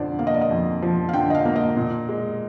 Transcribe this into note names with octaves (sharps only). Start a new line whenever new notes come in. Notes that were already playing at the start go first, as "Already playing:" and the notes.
Already playing: F2 D3 F3 C5 D5
A#3 F5
D#5
D5
D#5
F2
F3
F5
D3 G5
D#5
F5
A#3
D#5
A#2
G#3